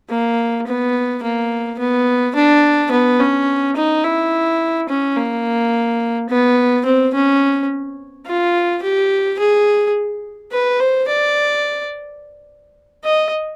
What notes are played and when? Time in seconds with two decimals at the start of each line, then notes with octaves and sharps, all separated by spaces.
0.10 A#3
0.67 B3
1.23 A#3
1.79 B3
2.36 D4
2.92 B3
3.20 C#4
3.77 D#4
4.04 E4
4.89 C#4
5.17 A#3
6.30 B3
6.86 C4
7.14 C#4
8.27 F4
8.83 G4
9.39 G#4
10.52 B4
10.80 C5
11.08 D5
13.05 D#5